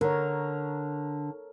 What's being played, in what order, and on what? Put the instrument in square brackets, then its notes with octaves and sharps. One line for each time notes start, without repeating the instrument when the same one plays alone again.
[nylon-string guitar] D3 [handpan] A#4 C#5